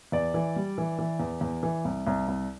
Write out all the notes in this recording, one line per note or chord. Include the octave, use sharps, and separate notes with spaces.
E2 D5
E3
G3
E3
E3
E2
E2
E3
C2
C2
C2